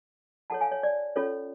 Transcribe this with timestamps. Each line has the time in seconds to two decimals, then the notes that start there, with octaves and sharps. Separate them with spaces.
0.50 F4 A4 C#5 F#5 A5
0.61 F5 G#5
0.71 C#5
0.83 D5
1.16 C#4 F4 A4 C#5